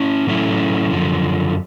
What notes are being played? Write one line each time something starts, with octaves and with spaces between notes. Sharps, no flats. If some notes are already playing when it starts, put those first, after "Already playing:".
Already playing: C#4 E4
A2 F#3 A3 C#4 E4
F#2 D3 F3